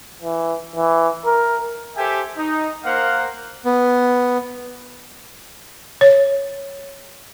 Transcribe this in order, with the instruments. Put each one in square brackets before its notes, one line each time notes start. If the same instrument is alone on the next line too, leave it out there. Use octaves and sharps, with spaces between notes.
[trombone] E3
E3
A#4
[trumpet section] G4 A4 C5 E5 G5 G#5
D#4
A#3 A#4 C5 F5 F#5
[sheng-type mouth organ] B3
[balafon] C#5